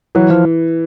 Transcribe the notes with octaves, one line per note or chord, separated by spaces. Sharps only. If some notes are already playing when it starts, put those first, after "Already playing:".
E3 F#3
F3